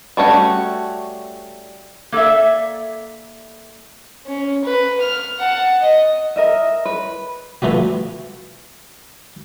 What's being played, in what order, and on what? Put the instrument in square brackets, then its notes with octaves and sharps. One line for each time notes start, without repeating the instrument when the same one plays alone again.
[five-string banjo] G3 A3 C#4 D4 F#4
[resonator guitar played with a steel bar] A#3 A4 D5 E5
[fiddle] C#4
B4
F6
F#5 A5
D#5
[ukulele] A#4 D#5 E5
B4
[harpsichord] E3 F3 A3 B3 F#4